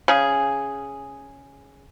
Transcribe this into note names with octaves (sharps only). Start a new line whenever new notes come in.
C#3 G#4